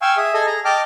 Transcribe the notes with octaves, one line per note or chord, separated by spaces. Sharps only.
F5 G5 G#5 C#6 E6
G#4 E5 D#6
G#4 A4 D#5 G#5 D#6
G#4 A#5
D#5 G5 A5 D6 F6